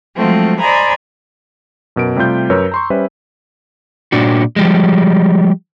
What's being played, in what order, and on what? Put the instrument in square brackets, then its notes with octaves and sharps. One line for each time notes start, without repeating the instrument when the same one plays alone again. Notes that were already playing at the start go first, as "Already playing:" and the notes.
[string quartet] F3 F#3 G#3 A3 C4 F4
C5 D5 D#5 G#5 A#5 B5
[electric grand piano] F#2 B2 A#4 D7
C3 G3 A3 F4 G6
F#2 A#4 B4 C#5 E6
A#5 C6 C#6
G3 C#4 B4 C5 E5
[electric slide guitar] A#2 D4 F#4
F3 G3 G#3